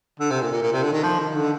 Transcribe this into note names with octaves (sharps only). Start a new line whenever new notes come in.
D3
C3
A#2
A#2
A#2
C3
D3
D#3
F3
D#3
D3